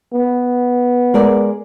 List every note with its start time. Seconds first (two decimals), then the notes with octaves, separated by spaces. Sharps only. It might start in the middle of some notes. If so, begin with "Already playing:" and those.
0.12 B3
1.14 G#3 A#4 D5